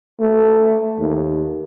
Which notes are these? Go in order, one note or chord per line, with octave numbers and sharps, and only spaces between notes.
A3
D#2